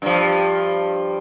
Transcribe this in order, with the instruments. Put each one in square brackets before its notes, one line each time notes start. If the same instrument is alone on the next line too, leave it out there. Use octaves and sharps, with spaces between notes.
[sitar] G2 F3